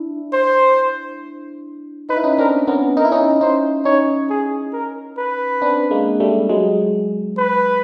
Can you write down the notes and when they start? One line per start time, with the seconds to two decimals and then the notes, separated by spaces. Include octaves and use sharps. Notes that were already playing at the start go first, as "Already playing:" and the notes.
Already playing: D4 E4
0.33 C5
2.09 D#4 B4
2.17 E4
2.24 C#4 D#4
2.38 C4 D4 A#4
2.67 B3 C#4 A#4
2.97 D#4 A#4
3.05 E4
3.12 C#4 D#4
3.41 C#4 D#4 C5
3.85 C#4 D#4 C#5
4.30 G#4
4.73 A#4
5.18 B4
5.62 C4 D4
5.91 G#3 A#3
6.20 G3 A3
6.49 F#3 G#3
7.38 B4